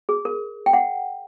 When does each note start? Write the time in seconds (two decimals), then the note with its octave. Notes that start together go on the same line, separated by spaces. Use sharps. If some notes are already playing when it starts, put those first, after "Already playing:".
0.09 G#4
0.25 A#4
0.66 G5
0.73 F#5